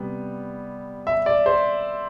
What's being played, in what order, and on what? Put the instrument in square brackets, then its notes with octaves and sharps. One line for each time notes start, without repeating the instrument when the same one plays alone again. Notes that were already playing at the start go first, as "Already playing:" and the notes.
Already playing: [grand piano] C3 G3 B3
E5
D5
C5